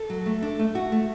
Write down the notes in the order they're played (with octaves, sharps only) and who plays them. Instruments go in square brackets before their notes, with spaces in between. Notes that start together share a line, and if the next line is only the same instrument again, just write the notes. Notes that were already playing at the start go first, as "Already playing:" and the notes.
Already playing: [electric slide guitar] A4
[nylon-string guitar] F#3
A3
D4
A3
F#4
A3